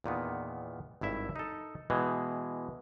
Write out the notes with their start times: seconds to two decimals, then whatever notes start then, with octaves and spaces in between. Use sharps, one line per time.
0.04 E2 A#2 D#3 B3
1.01 G#1 G2 E4 E5
1.36 D#4 A4
1.90 B2 E3 G#3